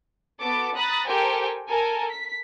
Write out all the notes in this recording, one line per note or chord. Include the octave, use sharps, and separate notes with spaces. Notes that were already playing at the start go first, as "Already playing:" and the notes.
B3 F#4 A4 A5 D6
A#5 B5 D#6 F#6 A6
G4 A4 A#4 C5 G5 G#5
A4 A#4 G#5
B6